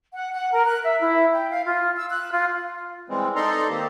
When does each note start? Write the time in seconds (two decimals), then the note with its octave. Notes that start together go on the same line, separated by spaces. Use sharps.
0.13 F#5
0.33 F#5
0.52 A#4
0.66 F#6
0.84 E5
1.00 E4
1.33 G5
1.50 F5
1.65 F4
1.96 E6
2.10 F#6
2.32 F4
3.09 E3 G3 G#3 C4
3.36 D#4 A4 D5 A#5 C6
3.69 D#3 A#3 C4 G4